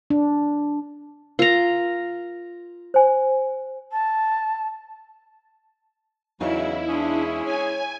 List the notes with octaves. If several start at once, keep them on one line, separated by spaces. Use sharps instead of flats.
D4
F4 A#4 A#5
C5 G#5
A5
E2 C#3 F#3 D#4 E4 F5
G#3 C#4 D4 G#4
C#5 G#5